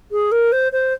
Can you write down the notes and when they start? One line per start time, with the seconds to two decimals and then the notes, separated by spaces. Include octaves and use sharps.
0.11 G#4
0.31 A#4
0.52 C5
0.72 C5